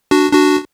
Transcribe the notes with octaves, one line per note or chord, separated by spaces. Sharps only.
D4 F#4
D4 F#4